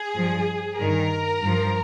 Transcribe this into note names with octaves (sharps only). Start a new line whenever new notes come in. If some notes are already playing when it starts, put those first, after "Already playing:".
Already playing: G#4
G2 F3
G2 D#3 A#4
G2 F3